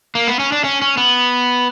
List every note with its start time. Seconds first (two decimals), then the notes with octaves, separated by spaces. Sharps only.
0.15 A#3
0.27 B3
0.39 C#4
0.52 D4
0.64 C#4
0.82 C#4
0.97 B3